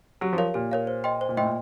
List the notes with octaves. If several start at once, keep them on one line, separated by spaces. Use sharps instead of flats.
F#3 G4
F3
A#4 C#5 F5
A#2 G4
A#4 C#5 F5
C5
D#5 G5 C6
C5
A#2
A2 D#5 G5 C6
A#2